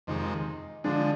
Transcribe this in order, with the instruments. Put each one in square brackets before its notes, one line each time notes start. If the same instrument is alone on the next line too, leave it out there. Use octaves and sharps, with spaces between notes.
[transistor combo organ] F2 C3 D#3 G#3 [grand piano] D#4
[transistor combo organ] D3 F3 G#3 [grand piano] D4